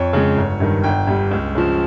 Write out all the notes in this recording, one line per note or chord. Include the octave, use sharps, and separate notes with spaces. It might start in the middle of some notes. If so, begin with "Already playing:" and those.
Already playing: F2 C#5
C#3 G#3
G1
G2 D#3
G1 G5
G2 G3
C#2
C#3 F3